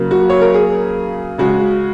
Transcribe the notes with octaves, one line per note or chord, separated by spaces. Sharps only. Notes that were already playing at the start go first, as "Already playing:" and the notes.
Already playing: C#3 F#3 A#3
F#4
C#5
A#4
G#4
C#3 G#3 F#4